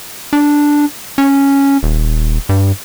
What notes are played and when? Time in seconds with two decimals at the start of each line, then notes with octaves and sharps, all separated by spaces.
0.33 D4
1.18 C#4
1.83 D#1
2.49 G2